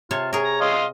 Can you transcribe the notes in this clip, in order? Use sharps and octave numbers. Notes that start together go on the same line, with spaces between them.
C3 F4 C#5 A5
G#4 A#4 C#5
A#5
D#5 F5 C6